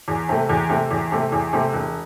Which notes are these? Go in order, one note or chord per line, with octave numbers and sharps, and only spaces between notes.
E2
C3 A3
E2
C3 A3
E2
C3 A3
E2
C3 A3
E1